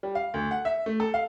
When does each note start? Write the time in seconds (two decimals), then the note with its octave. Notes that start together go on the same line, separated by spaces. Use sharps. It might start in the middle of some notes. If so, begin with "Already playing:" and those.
0.03 G3
0.15 F5
0.34 D2
0.51 F#5
0.65 E5
0.86 A3
1.00 A4
1.14 F5